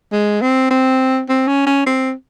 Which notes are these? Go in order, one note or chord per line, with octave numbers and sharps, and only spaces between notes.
G#3
C4
C4
C4
C#4
C#4
C4